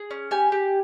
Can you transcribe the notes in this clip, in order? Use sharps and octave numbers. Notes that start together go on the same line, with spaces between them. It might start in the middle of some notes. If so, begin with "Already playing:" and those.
Already playing: G#4
C#4
G4 G#5
G4